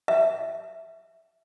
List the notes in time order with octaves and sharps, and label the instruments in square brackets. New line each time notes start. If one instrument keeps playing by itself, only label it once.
[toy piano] E5